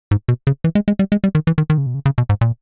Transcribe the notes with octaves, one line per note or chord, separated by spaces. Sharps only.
G#2
B2
C#3
E3
G#3
G#3
G3
G#3
G3
D#3
E3
D#3
D#3
C#3
B2
C#3
C#3
B2
G#2
A#2